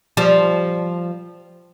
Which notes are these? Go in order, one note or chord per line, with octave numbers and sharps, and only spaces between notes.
F3 G3